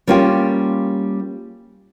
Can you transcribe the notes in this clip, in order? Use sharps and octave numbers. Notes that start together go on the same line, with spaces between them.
G3 A#3 C#4 F4 G4